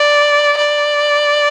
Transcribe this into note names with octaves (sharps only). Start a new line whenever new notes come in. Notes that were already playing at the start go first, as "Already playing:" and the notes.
Already playing: D5
D5